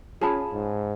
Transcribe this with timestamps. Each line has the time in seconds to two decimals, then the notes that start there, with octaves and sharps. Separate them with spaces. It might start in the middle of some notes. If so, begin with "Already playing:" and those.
0.22 C#4 F4 G#4 A5 B5
0.54 G#2